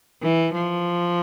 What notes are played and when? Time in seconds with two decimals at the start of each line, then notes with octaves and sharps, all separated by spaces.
0.22 E3
0.54 F3